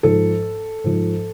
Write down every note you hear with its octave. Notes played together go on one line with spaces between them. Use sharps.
G#2 F3 A4
G#2 F3